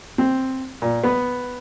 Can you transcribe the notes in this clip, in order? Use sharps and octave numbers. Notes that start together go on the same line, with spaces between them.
C4
A#2
B3